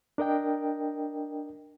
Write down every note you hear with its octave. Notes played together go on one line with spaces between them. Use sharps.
D4 A#4 D#5 G5